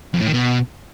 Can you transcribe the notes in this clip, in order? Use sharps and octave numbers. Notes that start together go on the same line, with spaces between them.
F2
A2
D#3
B2